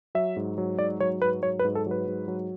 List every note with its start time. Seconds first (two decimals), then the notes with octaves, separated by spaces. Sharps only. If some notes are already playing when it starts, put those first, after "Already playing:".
0.15 F#3 E5
0.36 G#2
0.58 F#3
0.78 G#2 D5
1.00 F#3 C#5
1.22 G#2 B4
1.43 F#3 C#5
1.59 B4
1.65 G#2
1.75 A4
1.86 F#3
1.91 B4
2.07 G#2
2.28 F#3